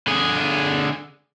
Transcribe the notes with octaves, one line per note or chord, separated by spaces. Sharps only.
D3 G#4